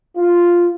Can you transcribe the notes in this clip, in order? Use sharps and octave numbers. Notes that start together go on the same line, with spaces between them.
F4